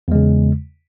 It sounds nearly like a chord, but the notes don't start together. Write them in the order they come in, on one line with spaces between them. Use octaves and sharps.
E2 G#3 C#3